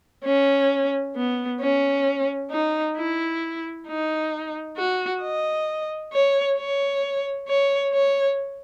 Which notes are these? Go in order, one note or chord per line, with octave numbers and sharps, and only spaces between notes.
C#4
B3
C#4
D#4
E4
D#4
F#4
D#5
C#5
C#5
C#5
C#5